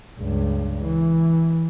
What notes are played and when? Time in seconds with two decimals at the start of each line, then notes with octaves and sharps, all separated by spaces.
0.20 C#2 G2
0.84 E3